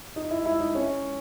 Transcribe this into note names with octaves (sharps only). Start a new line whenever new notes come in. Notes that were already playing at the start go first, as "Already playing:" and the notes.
D#4
E4
E4
D#4
C#4